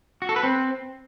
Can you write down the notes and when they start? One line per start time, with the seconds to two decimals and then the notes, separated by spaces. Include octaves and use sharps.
0.22 F#4
0.29 A4
0.36 B4
0.43 C4